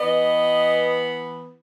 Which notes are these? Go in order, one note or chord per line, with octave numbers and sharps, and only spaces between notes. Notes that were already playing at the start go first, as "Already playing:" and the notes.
E3 B3 D#5